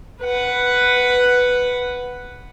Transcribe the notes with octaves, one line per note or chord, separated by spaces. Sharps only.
B4 F#5